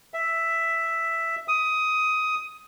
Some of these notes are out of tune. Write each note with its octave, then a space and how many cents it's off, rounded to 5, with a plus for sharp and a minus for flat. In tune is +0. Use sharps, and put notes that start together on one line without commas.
E5 +5
D#6 +15